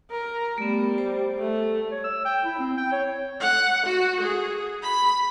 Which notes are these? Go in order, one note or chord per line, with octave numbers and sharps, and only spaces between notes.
A#4
G3 A3 B3
C5
A3
C#5
E6
G5
E4
C4
G5
C#5
F#5
F#4
G#4
B5